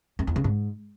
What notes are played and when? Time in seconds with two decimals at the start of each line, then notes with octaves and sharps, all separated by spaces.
0.19 F#2
0.27 E2
0.36 C#3
0.44 G#2